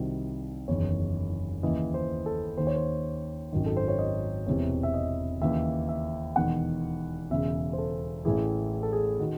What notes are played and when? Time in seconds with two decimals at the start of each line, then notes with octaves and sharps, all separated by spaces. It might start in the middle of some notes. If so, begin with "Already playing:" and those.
Already playing: C2 C3 D#3 F#4
0.68 F#1 E2 D#3 C#5
1.63 D#2 C#3 E3 D#5
1.94 C5
2.26 A4
2.57 D#2 D#3 C5
2.67 C#5
2.76 C5
3.53 G#1 F#2 D#3
3.66 A4
3.77 C5
3.88 C#5
3.99 D#5
4.47 E1 E2 C3 E3 C#5
4.83 E5
4.94 D#5
5.41 D#2 C#3 E3 E5
5.89 E5
6.36 E1 E2 D#3 F#5
7.30 E1 E2 C#3 E5
7.73 C5
7.78 A4
8.25 A1 A2 E3 G#4
8.73 G#4
8.83 A4
8.93 G#4
9.20 D#3 F#4